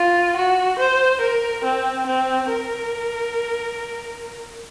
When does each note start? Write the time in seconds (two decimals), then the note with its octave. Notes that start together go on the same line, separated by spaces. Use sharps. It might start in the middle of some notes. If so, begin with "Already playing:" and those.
Already playing: F4
0.36 F#4
0.79 C5
1.21 A#4
1.64 C4
2.06 C4
2.49 A#4